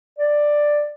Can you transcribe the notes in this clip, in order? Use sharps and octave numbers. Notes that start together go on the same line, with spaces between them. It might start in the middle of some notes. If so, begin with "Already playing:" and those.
D5